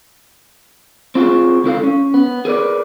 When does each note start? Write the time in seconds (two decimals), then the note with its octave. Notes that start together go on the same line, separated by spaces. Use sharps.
1.15 C4 F4 F#4 G#4
1.64 C#2 E4 A4 F5
1.83 C#4
2.14 B3
2.45 G#4 A#4 B4 D5